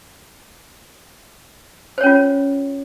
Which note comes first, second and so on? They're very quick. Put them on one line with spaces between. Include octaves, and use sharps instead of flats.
C5 C#5 C#4 F4